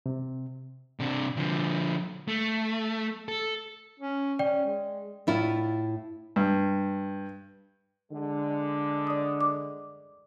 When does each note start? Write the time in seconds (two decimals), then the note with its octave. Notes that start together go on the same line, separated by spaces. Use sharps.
0.06 C3
1.00 C3 D4
1.36 D3 F3
2.28 A3
3.29 A4
4.00 C#4
4.39 C#4 D5 G5
4.65 G#3
5.27 A2 E4 F4
6.36 G2
8.12 D3 G#3
9.07 D5 D#6
9.41 D6